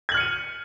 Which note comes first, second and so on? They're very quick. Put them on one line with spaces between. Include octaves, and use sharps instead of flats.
G#6 F#7 F6 C#7 D#7